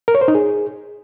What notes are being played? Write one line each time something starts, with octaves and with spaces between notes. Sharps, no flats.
A#4
C#5
C5
D#4
G#4